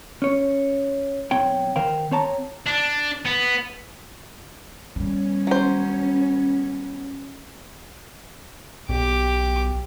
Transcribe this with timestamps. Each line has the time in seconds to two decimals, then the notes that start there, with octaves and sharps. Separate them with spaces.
0.22 C#4 C#5
1.31 B1 C4 C#5 G5
1.76 D#3 A#4 C5 F5 G5
2.11 C4 C#5 A5 A#5
2.67 D4
3.26 B3
4.96 D#3 G3 B3 C#4
5.47 F#3 C5
8.89 B1 G4 D6